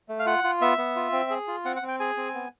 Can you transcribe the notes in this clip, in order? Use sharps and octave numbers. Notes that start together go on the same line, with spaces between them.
A3
F5
F4 F#5
F4
B3 E5
B3
F4
C4
G#4
F4
C4 F#5
F#5
C4
G5
G#4 G#5
C4
B3